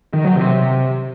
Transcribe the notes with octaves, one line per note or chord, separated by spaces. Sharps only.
D#3
F#3
C3